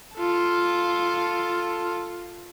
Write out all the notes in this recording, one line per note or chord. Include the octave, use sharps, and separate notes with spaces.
F4 A4